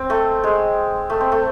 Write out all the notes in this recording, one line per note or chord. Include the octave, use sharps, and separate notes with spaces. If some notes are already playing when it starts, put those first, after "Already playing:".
Already playing: C4
A3
G#3
A3
C4
A3